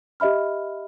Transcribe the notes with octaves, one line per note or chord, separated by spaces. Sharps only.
G4 D#5 E5 B5 F6